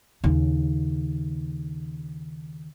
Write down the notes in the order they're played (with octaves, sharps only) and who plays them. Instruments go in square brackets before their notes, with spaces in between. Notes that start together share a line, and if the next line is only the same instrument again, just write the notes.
[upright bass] D#2 C#3